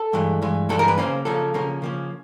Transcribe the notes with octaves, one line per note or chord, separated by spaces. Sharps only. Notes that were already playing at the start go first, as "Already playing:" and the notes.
Already playing: A4
G2 E3 G#3
G2 E3 G#3
G2 E3 G#3 A4
A#4
B4
C#3 F3 A#3 C#4 C5
C#3 F3 A#3 C#4 A4
C#3 F3 A#3 C#4
C#3 F3 A#3 C#4